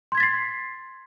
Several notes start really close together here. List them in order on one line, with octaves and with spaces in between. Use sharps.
C6 G#6 B6 A6 C7